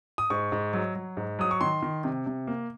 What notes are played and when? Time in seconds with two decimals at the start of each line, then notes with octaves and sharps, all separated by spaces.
0.18 D#6
0.30 G#2 C#6
0.52 G#2
0.73 F#3
0.95 F#3
1.17 G#2
1.39 F#3 D#6
1.51 C#6
1.61 D#3 C6
1.82 D#3
2.04 C3
2.26 C3
2.47 A#3